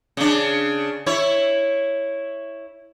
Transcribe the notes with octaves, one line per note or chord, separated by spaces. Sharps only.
C#3 D4
E4 C#5